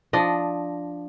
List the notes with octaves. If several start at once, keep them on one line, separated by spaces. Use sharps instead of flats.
F3 D4 D#5